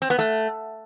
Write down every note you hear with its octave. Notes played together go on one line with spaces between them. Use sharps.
C4
B3
A3